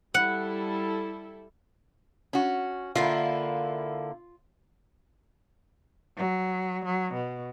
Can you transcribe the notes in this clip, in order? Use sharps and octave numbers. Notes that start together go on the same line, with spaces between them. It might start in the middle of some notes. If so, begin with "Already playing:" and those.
G3 E4 A4 F#5
C#4 F#4
D3 A#3 E4 F4
F#3
F#3
B2